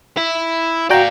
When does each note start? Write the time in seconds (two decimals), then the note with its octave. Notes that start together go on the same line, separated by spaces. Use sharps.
0.17 E4
0.90 F#4 D5 F5 G5 A#5